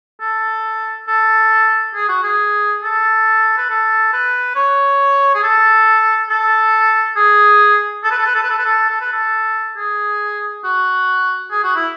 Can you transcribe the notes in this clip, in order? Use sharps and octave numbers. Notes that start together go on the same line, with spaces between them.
A4
A4
G#4
F#4
G#4
A4
B4
A4
B4
C#5
G#4
A4
A4
G#4
A4
B4
A4
B4
A4
B4
A4
B4
A4
A4
B4
A4
G#4
F#4
G#4
F#4
E4